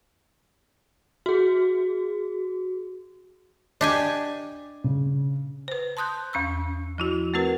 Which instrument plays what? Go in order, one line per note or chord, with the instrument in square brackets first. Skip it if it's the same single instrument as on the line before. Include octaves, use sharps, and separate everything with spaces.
[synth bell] F#4 G#4
[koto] D4 G4 G#5 [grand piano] D#5
[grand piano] C#3
[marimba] B4 C5
A5 C6 D#6 F#6 G6
E2 C#4 C#6 E6
F3 E4 F#4
A3 C4 F#4 A#4 B4